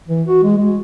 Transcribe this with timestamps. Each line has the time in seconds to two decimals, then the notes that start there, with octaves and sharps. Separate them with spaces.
0.08 E3
0.28 F#4
0.43 G#3
0.57 G#3